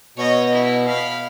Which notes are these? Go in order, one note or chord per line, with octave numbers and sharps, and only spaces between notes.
B2 C#5 D#5
E4
F5 B5